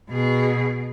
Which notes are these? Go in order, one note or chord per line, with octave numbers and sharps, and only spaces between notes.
B2 G#4